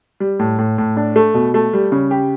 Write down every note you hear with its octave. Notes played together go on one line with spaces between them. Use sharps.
G3
A2
A2
A2
D4
A3
B2
A3
G3
C#3
G4